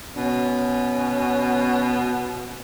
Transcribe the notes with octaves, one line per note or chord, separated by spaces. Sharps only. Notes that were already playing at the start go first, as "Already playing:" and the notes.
B2 C#4